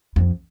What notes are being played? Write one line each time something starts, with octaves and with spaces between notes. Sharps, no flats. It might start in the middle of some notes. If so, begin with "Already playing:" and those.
F2